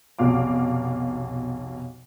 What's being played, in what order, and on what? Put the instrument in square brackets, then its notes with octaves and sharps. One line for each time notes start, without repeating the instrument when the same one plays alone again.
[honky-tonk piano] F1 B1 B2 F5 D6